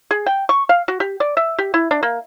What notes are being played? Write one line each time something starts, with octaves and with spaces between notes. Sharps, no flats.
G#4
G5
C#6
F5
F#4
G4
D5
E5
G4
E4
D4
A#3